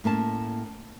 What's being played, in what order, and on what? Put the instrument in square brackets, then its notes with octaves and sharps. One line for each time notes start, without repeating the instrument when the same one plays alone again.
[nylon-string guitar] A2 A#3 C#4 A5